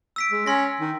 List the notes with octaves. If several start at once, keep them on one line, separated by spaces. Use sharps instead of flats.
E6 B6 D7
G#3
C#4 C6 A#6
D#3